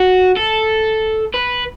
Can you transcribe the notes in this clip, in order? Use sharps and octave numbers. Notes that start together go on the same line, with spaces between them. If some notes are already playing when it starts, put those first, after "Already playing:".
Already playing: F#4
A4
B4